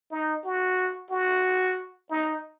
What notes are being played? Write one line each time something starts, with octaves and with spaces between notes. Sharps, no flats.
D#4
F#4
F#4
D#4